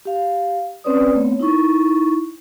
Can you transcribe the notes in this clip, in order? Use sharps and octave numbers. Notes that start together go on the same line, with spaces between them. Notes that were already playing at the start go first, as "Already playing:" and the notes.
G4 F5
C4 C#4 B4 C#5 D5 D#6
A3 B3 C4 C#5
D#4 E4 C#6